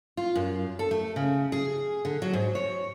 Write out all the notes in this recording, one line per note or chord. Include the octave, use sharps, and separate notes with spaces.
F4
F#2
A4
A3
C#3
G#4
D3
F#3
G#2
C#5